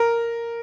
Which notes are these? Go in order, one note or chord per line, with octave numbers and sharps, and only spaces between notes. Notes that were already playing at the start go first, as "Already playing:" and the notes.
Already playing: A#4